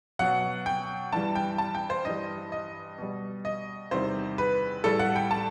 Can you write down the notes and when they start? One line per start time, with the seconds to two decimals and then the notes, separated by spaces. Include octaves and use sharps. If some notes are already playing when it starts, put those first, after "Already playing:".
0.19 B2 F#3 F#5
0.66 G5
1.12 G2 E3 G3 A5
1.35 G5
1.58 A5
1.75 G5
1.90 C5
2.05 G2 E3 G3 D#5
2.52 D#5
2.98 B2 G3
3.45 D#5
3.91 E2 C3 D#3 G3 C5
4.38 B4
4.84 A2 G3 A4
4.99 F#5
5.16 G5
5.31 A5